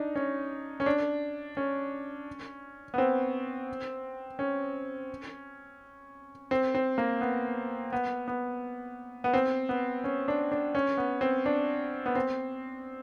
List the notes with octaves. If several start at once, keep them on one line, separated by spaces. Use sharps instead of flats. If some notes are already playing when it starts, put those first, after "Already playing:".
Already playing: D4 D#4
C#4
C#4
D4
C#4
B3
C4
C#4
C4
C4
A#3
B3
B3
B3
B3
C4
B3
C#4
D4
D4
C#4
B3
C4
D4
B3
C4